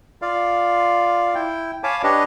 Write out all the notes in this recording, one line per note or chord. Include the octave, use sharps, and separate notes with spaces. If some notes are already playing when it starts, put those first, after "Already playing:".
F4 D5 F5
E4 G5
C#5 F5 G#5 A5 B5 D6
D4 G4 B4 C#5 D#5